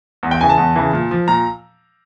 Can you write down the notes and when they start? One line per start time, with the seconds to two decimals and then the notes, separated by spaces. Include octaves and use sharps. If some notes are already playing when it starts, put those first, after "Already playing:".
0.23 E2
0.31 G5
0.41 C#3 E3 G#5
0.49 A5
0.57 E2
0.76 C#3 E3
0.93 A#2
1.11 F3
1.28 A#2 A#5